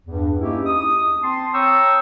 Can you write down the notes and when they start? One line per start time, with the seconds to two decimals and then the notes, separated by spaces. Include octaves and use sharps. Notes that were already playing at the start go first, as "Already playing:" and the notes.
0.05 E2 G2
0.40 A#3 C#4 D#4 E4 G4
0.66 D#6
1.22 C4 A5 C6
1.53 C#5 G5 A#5 C#6 D#6 E6